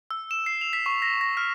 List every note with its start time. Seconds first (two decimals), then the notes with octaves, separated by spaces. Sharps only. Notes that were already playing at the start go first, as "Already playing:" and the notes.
0.11 E6
0.31 E7
0.46 C7
0.61 F7
0.73 B6
0.86 C#6
1.02 A#6
1.21 A#6
1.37 F6